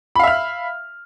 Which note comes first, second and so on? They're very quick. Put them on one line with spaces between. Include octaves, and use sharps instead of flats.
B5 F5 E5 F6